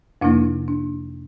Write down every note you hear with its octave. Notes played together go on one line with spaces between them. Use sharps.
F2 C3 F3 A#3 D4 E4
D4